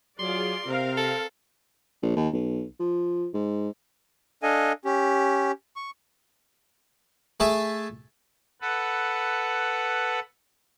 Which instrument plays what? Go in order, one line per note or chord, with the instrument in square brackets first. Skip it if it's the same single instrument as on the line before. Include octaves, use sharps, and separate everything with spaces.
[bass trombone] F#3 [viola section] F4 G#4 D5 [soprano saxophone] C6
[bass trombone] C3 [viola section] C4 A#4 F5
[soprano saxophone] A4
[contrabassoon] A#1
D#2
B1
F3
G#2
[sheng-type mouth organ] D4 A4 D#5 F5 G#5
C#4 G4
C#6
[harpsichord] A3 G#4 A4 E5
[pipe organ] A4 B4 F#5